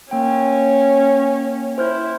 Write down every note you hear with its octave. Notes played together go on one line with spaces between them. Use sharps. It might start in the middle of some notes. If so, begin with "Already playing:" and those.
A#3 C#4 G5
E4 C5 F6 G6